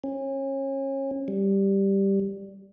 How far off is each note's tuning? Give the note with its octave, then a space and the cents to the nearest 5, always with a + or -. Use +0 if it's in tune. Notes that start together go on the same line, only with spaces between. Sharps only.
C#4 -30
G3 +0